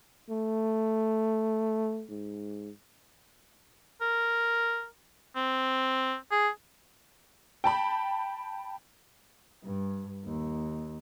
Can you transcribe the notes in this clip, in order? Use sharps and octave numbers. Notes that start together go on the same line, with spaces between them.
A3
G#2
A#4
C4
G#4
G5 A5 B5
G2
D#2